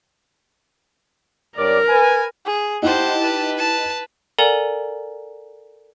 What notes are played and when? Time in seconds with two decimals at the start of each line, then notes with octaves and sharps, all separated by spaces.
1.57 G2 A#4 C#5 D5
1.89 B4 G#5
2.45 G#4
2.82 D#4 E4 G4 C5 F#5 A5
3.22 B4
3.58 A5
4.39 A4 A#4 D5 F#5 G#5 A#5